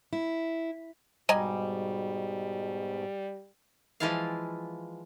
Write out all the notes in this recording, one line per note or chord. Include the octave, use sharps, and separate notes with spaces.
E4
G#2 B2 G3 D#5 G#5 A#5
E3 F3 G#3 E4 F4 F5